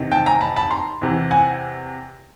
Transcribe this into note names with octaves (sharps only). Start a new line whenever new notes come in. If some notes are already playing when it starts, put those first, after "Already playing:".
Already playing: E2 C3 D#3
G5 A5
G#5 A#5
A5 B5
A5 B5
A#5 C6
E2 C3 E3
F#5 G#5